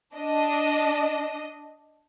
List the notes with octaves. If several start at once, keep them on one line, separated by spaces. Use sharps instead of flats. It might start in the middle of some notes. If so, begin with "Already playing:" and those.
D4 D#5